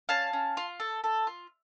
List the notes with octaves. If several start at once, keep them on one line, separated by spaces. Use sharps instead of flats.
C#4 F5 A5
C#4
F4
A4
A4
F4